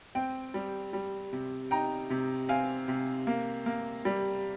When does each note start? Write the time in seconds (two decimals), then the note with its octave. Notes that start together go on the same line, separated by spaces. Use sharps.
0.15 C4 G5
0.54 G3
0.93 G3
1.33 C3
1.71 D#4 G5 A#5
2.10 C3
2.49 C4 F5 G#5
2.88 C3
3.27 A#3
3.66 A#3
4.05 G3